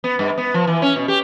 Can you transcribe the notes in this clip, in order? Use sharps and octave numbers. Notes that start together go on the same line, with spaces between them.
B3
G2
B3
F3
E3
C#4
B2
G4